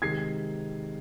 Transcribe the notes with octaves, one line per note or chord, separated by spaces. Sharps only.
C3 D#3 G#3 G#6 C7